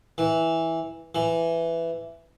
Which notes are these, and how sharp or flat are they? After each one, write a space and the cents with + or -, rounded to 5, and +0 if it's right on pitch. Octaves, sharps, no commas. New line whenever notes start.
E3 -10
E3 +10